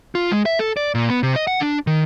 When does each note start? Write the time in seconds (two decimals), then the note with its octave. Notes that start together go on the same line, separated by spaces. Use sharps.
0.15 F4
0.32 G#3
0.46 E5
0.59 A4
0.77 D5
0.95 A#2
1.10 B3
1.23 C3
1.36 D#5
1.47 F#5
1.61 D4
1.87 D#3